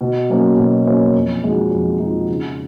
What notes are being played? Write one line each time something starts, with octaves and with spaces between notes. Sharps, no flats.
B2
F#3 A#3 C#4
B2
F#3 A#3 C#4
F2
F3 G#3 D#4 F#4
F2
F3 G#3 D#4 F#4
C#3